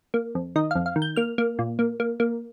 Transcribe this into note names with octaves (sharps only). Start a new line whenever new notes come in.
A#3
F2
D#3 D#5
F2 F5
F5
D#3
G6
A#3 F6
A#3
A#2
A#3
A#3
A#3